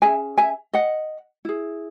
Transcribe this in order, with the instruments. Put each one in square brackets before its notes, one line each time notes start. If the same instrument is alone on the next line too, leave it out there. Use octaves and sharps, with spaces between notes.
[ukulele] C#4 G#4 E5 G#5
E5 G#5
D#5 F#5
E4 G#4